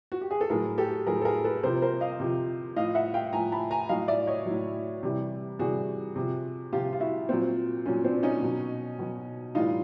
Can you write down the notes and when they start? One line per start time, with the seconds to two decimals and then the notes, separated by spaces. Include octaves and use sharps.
0.12 F#4
0.21 G4
0.31 G#4
0.41 A4
0.50 A2 F#3 G#4 A#4
0.78 G4 A4
1.06 A2 F#3 G#4 A#4
1.22 A4
1.25 G#4 A#4
1.44 A4 B4
1.63 C3 F3 A#4 C5
1.82 A#4 C5
2.01 D#5 F5
2.20 C3 F3
2.76 A2 F3 D#5 F5
2.95 E5 F#5
3.14 F5 G5
3.33 A2 F3 G#5 A#5
3.52 A5 B5
3.71 G#5 A#5
3.89 A2 F#3 D#5 F5
4.08 D5 E5
4.27 C#5 D#5
4.46 A2 F#3
5.03 C3 E3 G3
5.59 C3 E3 G3 F#4 G#4
6.16 C3 F3
6.73 C3 F3 F4 G4
6.93 F4
7.00 E4 F#4
7.29 A#2 F#3 C4
7.86 A#2 F#3 C#4
8.04 C4 D4
8.23 C#4 D#4
8.42 B2 F#3
8.99 B2 F#3
9.55 A2 E3 G3 D#4 F4